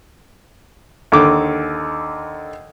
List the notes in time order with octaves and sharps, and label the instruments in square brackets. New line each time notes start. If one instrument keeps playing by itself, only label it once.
[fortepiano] D#2 D3 D6